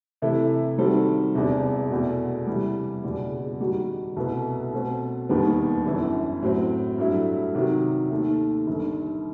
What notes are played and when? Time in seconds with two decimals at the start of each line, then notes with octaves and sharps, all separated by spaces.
0.22 C3 E3 A3 E4 A4
0.78 D#3 G3 C4 F#4 A4
1.35 E1 E2 C3
1.91 E2 B2 A3
2.47 C3 E3 G3
3.04 F#1 E2 B2 G3
3.60 D#3 G3 D#4 F#4
4.16 C2 B2 A3 E4 B4
4.73 B2 A3 C4
5.29 E1 D#2 D#3 G3 B3
5.86 G1 F#2 E3
6.42 A2 F#3 C4
6.98 G2 F#3 A3 E4
7.55 C3 D#3 F#3
8.11 D#2 D#3 A3
8.67 G1 G2 D#3